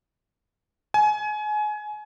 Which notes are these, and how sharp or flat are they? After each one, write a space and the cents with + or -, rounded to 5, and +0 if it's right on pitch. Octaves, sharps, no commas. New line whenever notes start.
G#5 +25